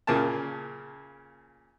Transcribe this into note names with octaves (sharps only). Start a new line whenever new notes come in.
A#2 C#3 A#3 A5